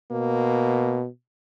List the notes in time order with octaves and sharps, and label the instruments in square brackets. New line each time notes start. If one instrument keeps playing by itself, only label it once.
[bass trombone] B2 [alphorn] A#3